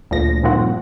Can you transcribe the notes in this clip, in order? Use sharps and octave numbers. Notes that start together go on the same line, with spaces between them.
D2 A#2 F3 A#6
G2 A#2 D#3 F3 C4 F#4